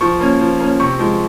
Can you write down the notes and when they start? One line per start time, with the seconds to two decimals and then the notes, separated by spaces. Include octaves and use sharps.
0.01 F3 C#6
0.20 A#3 C#4
0.40 F3
0.60 A#3 C#4
0.80 C3 C#6
0.99 F3 G#3